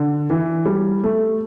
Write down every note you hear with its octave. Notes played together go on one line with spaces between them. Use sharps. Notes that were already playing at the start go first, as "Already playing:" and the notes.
Already playing: D3
E3
G3
A3